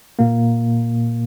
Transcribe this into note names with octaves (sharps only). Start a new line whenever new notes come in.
A#2 A#3